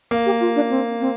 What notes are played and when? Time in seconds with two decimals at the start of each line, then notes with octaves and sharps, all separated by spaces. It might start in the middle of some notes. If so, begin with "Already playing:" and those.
0.11 A#3
0.26 G4
0.41 F4
0.56 D4
0.70 C4
1.00 C4